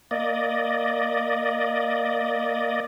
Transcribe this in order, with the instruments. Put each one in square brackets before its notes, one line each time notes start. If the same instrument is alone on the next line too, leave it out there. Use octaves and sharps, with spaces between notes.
[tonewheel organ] A#3 D5 D#5